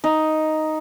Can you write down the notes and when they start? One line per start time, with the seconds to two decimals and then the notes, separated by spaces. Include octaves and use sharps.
0.04 D#4